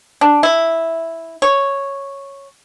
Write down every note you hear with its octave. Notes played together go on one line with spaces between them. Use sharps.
D4
E4
C#5